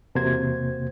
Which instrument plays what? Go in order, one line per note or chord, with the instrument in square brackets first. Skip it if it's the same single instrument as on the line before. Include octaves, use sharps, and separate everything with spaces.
[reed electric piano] E2 C3 A#3 F#4 C5 G#6